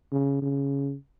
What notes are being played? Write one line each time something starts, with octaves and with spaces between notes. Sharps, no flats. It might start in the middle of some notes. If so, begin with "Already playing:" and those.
C#3
C#3